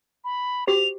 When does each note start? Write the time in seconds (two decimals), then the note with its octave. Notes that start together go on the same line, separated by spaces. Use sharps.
0.25 B5
0.67 F#4 G4 C5 F7